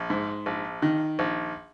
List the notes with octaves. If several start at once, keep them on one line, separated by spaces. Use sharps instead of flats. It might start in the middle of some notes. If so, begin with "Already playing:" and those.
Already playing: A#1
G#2
A#1
D#3
A#1